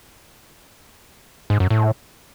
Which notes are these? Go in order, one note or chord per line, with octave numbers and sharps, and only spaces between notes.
G#2
F#2
A2